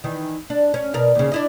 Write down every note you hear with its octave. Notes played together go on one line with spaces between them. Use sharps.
D#3 E3
D4
C#4
B2 A#4 D5
D#2 C#3
D4 E4 D#5